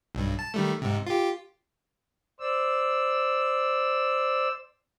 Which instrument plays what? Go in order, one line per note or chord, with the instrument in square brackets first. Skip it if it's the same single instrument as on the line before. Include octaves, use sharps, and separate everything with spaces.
[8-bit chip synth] B1 G2
A5
D#3 G3 A3
G#2 C3
F4 G4
[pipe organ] C5 D5 E6